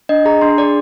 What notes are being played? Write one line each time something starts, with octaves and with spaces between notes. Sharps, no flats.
D4 D#5
G#4 A#5
D4 C6
G#4 D5